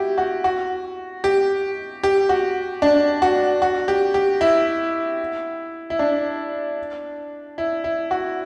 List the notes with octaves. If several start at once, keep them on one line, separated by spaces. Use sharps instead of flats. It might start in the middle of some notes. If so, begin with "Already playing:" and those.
Already playing: E4 F#4 G4
F#4
F#4
G4
G4
F#4
D4
F#4
F#4
G4
G4
E4
E4
D4
E4
E4
F#4